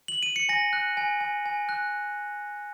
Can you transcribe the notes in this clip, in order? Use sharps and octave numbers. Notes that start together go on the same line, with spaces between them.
F#7
D#7
C#7
G#5 A#6
F#6
G#5
G#5
G#5
F#6